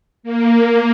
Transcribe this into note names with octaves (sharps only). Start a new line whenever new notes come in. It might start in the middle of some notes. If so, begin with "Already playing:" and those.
A#3